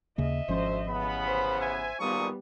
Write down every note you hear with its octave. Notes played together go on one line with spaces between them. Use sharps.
D#2 C#3 A#3 D#5 E5
G#1 D2 F3 C#4 C5
A1 C#3 B3 B5
C5
E5 G#5
G#1 A#2 G3 B3 A4 C#6 D#6